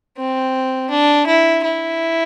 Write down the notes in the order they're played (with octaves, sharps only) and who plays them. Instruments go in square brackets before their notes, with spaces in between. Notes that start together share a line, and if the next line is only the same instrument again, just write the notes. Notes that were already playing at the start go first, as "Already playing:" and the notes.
[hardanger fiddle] C4
D4
E4
E4